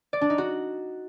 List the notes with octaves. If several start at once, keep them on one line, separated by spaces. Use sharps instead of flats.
D5
D4
D#4
F#4